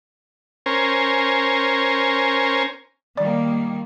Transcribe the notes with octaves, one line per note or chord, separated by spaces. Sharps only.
C#4 A#4 C5 G#5
D#3 G3 A#3 D5